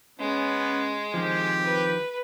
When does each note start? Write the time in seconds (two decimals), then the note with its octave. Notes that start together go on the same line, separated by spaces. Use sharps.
0.19 G#3 B3 C#4
1.14 D#3 F3 C4 G4
1.64 B4